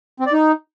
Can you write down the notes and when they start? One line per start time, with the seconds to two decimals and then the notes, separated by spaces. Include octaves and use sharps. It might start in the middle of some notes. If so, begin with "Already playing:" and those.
0.20 C4
0.26 D5
0.33 D#4